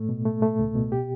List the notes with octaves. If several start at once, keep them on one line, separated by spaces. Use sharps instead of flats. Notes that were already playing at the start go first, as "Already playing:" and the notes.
Already playing: A2 A3
B2
A3
A3
C#2
B2
G4